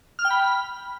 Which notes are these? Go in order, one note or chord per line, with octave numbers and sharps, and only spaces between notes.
F6
G5
B5